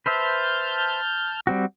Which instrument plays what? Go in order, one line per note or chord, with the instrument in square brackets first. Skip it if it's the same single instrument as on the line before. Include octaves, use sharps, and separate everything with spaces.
[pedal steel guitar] B4 C5 E5 [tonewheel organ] A5 F6 G6
[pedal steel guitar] G3 C4 F#4